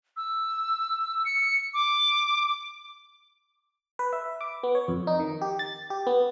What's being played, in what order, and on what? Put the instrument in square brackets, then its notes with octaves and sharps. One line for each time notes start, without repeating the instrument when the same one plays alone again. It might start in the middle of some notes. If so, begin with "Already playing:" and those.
[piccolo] E6
C#7
D6
[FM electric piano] B4
E5
D6
B3
C#5
F2
D#4
D#3
G4
A6
G4
B3